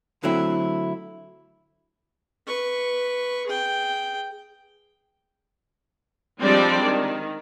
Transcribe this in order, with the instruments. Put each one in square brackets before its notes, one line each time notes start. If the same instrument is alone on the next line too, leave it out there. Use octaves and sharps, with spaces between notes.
[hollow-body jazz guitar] D3 F#3 A3 C4 E4
[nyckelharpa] B4 C#6
G#4 G5
[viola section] F3 G3 G#3 C4 D4 D5
D#3